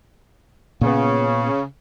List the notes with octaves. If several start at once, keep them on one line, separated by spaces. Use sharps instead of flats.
A#2 C#3 B3